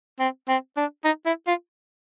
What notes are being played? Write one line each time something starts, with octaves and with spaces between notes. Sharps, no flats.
C4
C4
D4
D#4
E4
F4